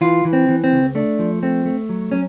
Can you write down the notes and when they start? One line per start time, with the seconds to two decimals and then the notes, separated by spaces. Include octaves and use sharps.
0.01 E3 F4
0.25 E3
0.33 C4
0.49 E3
0.64 C4
0.72 C#2
0.95 A3 D4
1.19 F3
1.43 A3 C4
1.65 A3
1.89 F#3
2.11 F#3 C#4